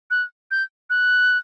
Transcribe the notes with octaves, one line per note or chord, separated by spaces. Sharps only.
F#6
G6
F#6